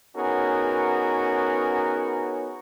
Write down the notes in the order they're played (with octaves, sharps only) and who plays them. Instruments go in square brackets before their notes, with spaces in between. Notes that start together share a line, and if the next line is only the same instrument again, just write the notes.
[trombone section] B3 C#4 D#4 F#4 G#4 A#4